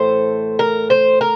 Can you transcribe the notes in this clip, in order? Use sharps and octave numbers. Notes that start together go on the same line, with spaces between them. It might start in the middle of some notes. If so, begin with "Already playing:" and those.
Already playing: A2 E3 A3 C5
A#4
C5
A#4